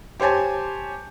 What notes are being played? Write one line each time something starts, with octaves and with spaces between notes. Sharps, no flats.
G4 C5 C#5 G#5 A5